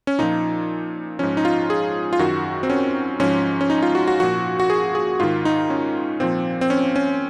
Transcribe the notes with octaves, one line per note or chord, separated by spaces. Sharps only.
C#4
A#2 F3 D#4
G#2 F3 C#4
D#4
F4
G#4
F4
F#2 D#3 F#4
C4
C#4
G#2 F3 C#4
C#4
D#4
F4
F#4
F#4
A#2 F3 F#4
F#4
G#4
G#4
G#2 D#3 F4
D#4
C#4
A#2 F3 C4
C4
C#4
C#4